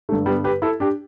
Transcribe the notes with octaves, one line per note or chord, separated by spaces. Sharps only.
G2 D3 A3
G3 B3
G4 B4
E4 A4
D4 G4